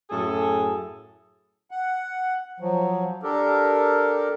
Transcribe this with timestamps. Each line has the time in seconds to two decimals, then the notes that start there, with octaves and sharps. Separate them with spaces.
0.10 F#2 A2 G#4 A4
1.71 F#5
2.60 F3 F#3
3.23 D4 G4 A4 A#4